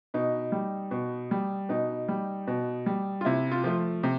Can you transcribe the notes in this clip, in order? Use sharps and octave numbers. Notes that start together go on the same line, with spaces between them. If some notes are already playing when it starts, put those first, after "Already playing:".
B2 D#4
G3
B2
G3
B2 D#4
G3
B2
G3
F4
C3 E4
F4
F3 A3
C3